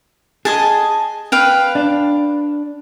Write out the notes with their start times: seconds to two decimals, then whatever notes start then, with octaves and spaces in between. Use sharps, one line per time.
0.45 G#4 D#5 G#5 A5
1.32 B4 F5 G5
1.75 D4